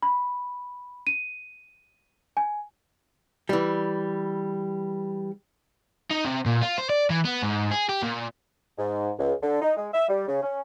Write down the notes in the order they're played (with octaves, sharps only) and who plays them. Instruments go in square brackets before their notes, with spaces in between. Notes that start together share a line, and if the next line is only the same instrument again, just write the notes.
[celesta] B5
D#7
G#5
[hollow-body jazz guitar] E3 G3
[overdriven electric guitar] D#4
C3
A#2
F4
C5
D5
E3
B3
G#2
G#4
G4
A#2
[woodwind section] G#2
C#2
D3
D#4
G#3
E5
G3
C#3
C#4